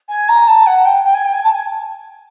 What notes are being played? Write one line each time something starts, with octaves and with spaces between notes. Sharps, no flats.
G#5
A#5
A5
F#5
G5
G5
G#5
G5
G#5
A5
G#5